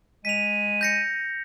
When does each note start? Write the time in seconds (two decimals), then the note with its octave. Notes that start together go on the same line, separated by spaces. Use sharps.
0.25 G#3 B6 D#7 F7
0.81 G6 A#6 C#7